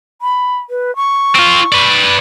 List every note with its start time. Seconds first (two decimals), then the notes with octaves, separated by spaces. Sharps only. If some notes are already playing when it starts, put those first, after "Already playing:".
0.22 B5
0.70 B4
0.96 C#6
1.35 C4 F4
1.72 B4 D5